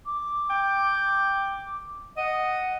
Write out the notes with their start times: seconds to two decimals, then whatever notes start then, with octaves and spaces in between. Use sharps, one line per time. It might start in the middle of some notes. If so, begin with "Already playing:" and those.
0.06 D6
0.50 G5
2.17 D#5 F#5